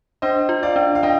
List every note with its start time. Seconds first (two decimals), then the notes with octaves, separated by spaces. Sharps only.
0.22 D4 C5 D#5
0.49 F4
0.63 D5 F5
0.76 D4
0.95 F5
1.03 D4 D#5 G5